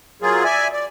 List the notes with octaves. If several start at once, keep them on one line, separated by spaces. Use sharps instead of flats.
F#3 A#3 F4 G#4
D5 E5 G#5
D5